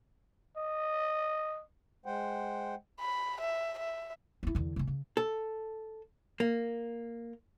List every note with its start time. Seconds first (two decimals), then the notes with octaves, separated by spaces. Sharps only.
0.57 D#5
2.06 G#3 C5 F#5 G5
3.00 B5
3.41 E5
3.79 E5
4.43 B3 E4
4.55 E2 D3
4.76 C#3 C#4
4.87 C#3
5.17 A4
6.40 A#3